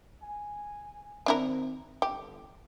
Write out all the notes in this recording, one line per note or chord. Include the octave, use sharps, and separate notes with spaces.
G#5
D#3 C4 D4 E4 A#4
G1 G4